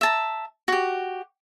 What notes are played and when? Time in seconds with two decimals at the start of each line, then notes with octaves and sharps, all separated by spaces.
0.01 E5 A5 A#5
0.68 F#4 G4